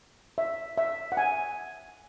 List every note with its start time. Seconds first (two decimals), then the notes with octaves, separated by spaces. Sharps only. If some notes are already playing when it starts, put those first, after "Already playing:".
0.38 E5
0.78 E5
1.12 F#5
1.17 G#5